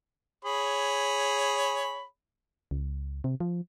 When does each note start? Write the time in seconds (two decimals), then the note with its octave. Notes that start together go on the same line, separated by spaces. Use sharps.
0.45 G#4 C#5 B5
2.71 C#2
3.24 C3
3.40 F3